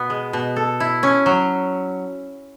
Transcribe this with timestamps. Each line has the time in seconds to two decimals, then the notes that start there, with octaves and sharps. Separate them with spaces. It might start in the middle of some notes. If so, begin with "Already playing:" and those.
Already playing: B2 B3
0.10 G#3
0.33 B2
0.56 A4
0.80 E4
1.03 C#4
1.26 F#3